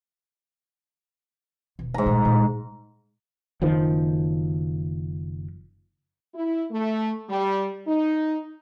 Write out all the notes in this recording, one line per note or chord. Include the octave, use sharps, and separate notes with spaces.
E1
G#2 A#5
A#2 G3
A#2 C#3
F#1 D#3 F3
E4
A3
G3
D#4